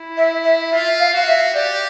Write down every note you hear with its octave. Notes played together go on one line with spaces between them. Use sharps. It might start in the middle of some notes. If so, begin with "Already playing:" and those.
Already playing: E4
E5
E5
F4 E5
F5
F#4 F5
E5
G4 D5